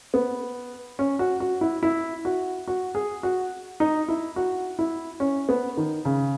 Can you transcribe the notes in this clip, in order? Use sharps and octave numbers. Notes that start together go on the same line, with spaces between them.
B3
C#4
F#4
F#4
E4
E4
F#4
F#4
G#4
F#4
D#4
E4
F#4
E4
C#4
B3
D#3
C#3